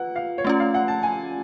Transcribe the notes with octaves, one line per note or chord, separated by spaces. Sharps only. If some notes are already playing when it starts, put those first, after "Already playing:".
Already playing: F4 B4 F#5
F5
C#5
A3 C#4 F4 D5
F5
F#5
A5
G#5